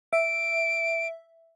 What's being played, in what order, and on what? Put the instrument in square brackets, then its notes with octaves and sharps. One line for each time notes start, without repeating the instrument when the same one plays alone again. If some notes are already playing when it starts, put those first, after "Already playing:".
[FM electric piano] E5 [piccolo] D7